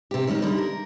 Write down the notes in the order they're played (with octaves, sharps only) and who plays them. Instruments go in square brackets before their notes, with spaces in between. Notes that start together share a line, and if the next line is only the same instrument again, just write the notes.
[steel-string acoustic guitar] C3 G4
D#3 G3 G#3 C#4 D#4
D3 G3 D#4
A#4